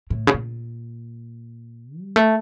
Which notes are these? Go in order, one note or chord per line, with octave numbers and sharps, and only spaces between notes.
A2
C#3
A#2
G3
A3